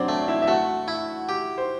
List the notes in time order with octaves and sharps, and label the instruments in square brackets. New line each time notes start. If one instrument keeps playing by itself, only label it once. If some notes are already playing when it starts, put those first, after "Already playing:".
Already playing: [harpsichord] F#3 [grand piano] C4 D4 C5 D5
[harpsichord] A3
[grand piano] E4 E5
E5
[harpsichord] A3 [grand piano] F#4 F#5
[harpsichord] E4
G4
[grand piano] C5